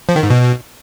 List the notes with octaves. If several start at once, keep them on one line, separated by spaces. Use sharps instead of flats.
F3
D#3
G#2
B2